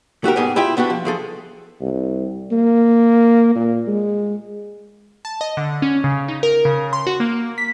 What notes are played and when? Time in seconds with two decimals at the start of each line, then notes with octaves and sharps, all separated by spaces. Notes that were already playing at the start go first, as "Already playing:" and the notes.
0.24 A3 F#4 G4 A#4
0.36 G#2 G3 B3 G4 G#4
0.56 E4 F4 G4 G5
0.77 B3 D4 F#4 G4
0.90 F3
1.05 F3 G#4 A4
1.81 C2
2.52 A#3
3.55 A#2
3.87 G#3
5.25 A5
5.41 D#5
5.57 D3
5.82 C#4
6.04 C#3
6.28 D#4
6.43 A#4
6.65 C#3
6.93 C6
7.07 F#4
7.20 A#3
7.58 B6